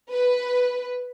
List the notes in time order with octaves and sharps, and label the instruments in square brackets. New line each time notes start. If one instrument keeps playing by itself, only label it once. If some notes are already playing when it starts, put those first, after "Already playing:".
[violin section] B4